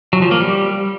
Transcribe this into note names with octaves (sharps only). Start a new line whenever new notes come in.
F#3
F3
A#3
G3